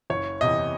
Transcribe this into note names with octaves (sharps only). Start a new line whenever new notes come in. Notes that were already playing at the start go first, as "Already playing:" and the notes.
F#1 C#5
E2 C3 E3 D#5